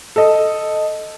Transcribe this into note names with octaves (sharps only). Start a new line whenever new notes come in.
A4 D#5